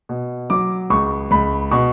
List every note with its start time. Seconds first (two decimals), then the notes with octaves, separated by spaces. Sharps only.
0.09 B2
0.50 F#3 D6
0.90 C#2 C#6
1.31 C#2 B5
1.71 B2 C#6